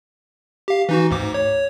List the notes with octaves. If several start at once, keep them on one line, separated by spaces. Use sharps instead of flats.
G4 F5
E3 D#4 F#4
D2 G#2 D6
C#5